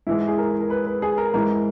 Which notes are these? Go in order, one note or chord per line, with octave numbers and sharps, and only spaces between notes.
G#2 E3 G#3 E4
G#4
A#4
A#4
B4
B4
G#4
A#4
G#2 E3 G#3 A#4